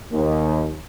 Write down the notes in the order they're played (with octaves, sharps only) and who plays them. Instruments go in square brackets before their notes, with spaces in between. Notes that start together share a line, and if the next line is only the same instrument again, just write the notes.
[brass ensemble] D#2